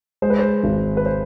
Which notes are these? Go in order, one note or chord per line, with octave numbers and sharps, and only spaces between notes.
G#3 C5
B4
C5
G#1
B4
C5